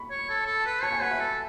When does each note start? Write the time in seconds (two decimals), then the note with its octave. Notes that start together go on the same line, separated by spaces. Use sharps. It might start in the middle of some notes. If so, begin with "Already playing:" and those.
Already playing: B5 C#6
0.10 C#5
0.29 A4
0.46 A4
0.66 B4
0.83 C#5 A5
0.92 G#5
1.02 B4 F#5
1.11 E5
1.20 A4